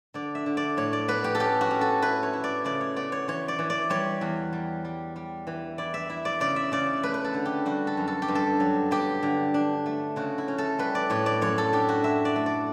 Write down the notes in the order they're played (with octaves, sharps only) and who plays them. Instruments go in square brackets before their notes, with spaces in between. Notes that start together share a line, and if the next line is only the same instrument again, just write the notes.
[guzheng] D3 D5
E5
D3
D5
A2 C#5
D5
B3 B4
G4
A4
C#4 G4
F#4
C#4
A4
E4 B4
C#5
E4
D5
C#3 D5
C#5
B3 D5
C#5
E3 C#5
D5
E3
D5
G3 C#5
E2
G3
G3
G3
E3
E4 D5
E5
E4
D5
C#3 D5
E5
C#3 D5
A3 B4
B4
A4
D3
G4
G3 F#4
A4
F#2
A4
G4
G2
A4
F#3
B3 G4
D3
D4
A3
C#3 F#4
E4
C#4
A4
G3 B4
D5
A2 C#5
D5
F#2 C#5
A4
D4 G4
F#4
E4 E5
D5
A3
D5